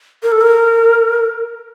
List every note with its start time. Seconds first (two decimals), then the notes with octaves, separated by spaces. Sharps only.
0.23 A#4
0.32 A4
0.41 A#4